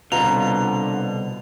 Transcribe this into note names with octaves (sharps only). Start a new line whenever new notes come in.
C2 B2 D3 F4 B4 A#5 F7